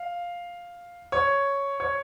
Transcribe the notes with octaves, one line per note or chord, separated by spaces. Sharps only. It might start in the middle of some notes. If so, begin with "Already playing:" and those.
Already playing: F5
C#5
C#5